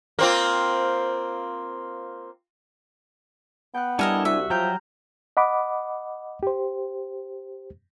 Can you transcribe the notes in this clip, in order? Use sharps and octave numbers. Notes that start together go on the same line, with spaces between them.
A#3 C4 F4
B3 G5 F#6
G3 D4 E4 A4 A#4 D#5 G#5
C2 F#4 E5 F#6
F3 F#3 G5 A#5 F6 G6
D#5 F#5 B5 D6
G4 C5